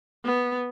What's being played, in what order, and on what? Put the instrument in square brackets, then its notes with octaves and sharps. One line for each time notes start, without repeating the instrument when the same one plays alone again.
[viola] B3